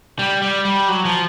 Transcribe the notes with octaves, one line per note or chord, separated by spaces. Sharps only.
G3
G3
G3
F#3
F3